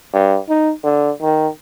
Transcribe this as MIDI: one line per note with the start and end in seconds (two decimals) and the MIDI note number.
0.13 0.38 43
0.49 0.72 63
0.84 1.11 50
1.22 1.48 51